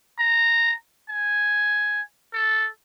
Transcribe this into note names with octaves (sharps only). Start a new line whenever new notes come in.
A#5
G#5
A4